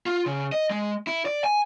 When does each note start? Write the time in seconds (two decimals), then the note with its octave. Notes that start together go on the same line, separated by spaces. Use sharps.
0.06 F4
0.26 C#3
0.52 D#5
0.70 G#3
1.07 E4
1.26 D5
1.44 G#5